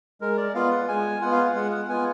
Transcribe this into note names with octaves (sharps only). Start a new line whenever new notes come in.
G#3 A#4
D5
B3 F4 F5
F#5
G#3 G#5
B3 F4 F#5
F5
F#5
G#3 F#5
F#5
B3 F4 G#5